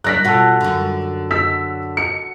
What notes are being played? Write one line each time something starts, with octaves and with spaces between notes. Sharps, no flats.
F#3 D4 F#6 A#6 B6
B2 F4 F#4 A4
F#2 D3
E6 B6
C#7